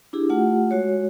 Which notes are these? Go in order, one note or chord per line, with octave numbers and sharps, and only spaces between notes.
D4 E4 G4 G#4
A3 F4 G4 F#5
G#3 F#4 C#5